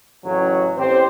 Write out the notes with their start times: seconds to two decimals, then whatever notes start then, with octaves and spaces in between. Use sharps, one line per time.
0.25 A1 C#3 F#3 C#5
0.77 A1 C4 G4 C5